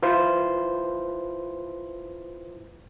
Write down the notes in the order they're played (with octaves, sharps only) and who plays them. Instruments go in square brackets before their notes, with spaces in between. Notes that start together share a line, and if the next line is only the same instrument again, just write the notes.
[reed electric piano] E4 F4 B4 C5